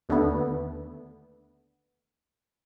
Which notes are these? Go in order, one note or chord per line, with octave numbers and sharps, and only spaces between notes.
D#2 D3 A3 B3